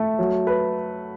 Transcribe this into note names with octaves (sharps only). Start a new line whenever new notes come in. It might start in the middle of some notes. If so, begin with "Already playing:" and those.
Already playing: A3
F#3
B4